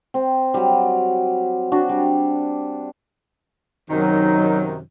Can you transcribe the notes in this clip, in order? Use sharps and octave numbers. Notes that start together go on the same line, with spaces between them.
C4
F#3 G3
D4 F#4
G3
F#2 C3 D#3 F#3 D#4